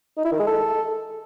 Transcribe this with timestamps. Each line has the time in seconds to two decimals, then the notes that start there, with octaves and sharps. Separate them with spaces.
0.17 D#4
0.25 E4
0.32 D#3
0.39 G#3
0.47 A4